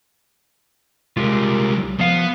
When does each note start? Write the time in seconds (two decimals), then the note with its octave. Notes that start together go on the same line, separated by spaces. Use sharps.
1.17 C2 G#3 F4 G4 A#4
2.00 F3 B3 F5